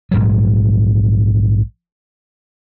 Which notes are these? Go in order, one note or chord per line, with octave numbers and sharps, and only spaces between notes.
A#1 G#2 F#3